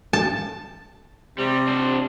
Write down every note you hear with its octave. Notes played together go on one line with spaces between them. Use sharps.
A5
C3 G3
D4 C5